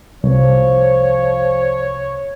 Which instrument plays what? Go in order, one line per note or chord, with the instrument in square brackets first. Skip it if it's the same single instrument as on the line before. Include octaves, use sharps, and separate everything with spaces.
[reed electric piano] C2 [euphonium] F3 [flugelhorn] C#5